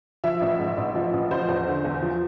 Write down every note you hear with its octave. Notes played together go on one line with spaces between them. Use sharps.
F3 E5
A1
G#2
A1
F3
A1
F3 C5
E2
D3
E2
F3